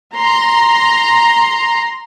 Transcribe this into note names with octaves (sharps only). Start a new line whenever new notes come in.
A#5 C6